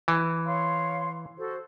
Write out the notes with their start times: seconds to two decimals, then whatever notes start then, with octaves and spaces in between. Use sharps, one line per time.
0.08 E3
0.46 C#5 F5 C6
1.38 F#4 A4 C5